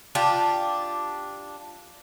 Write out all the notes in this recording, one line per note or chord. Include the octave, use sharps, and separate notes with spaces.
D4 F4 G4